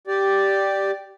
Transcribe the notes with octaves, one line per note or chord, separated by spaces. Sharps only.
G4 D5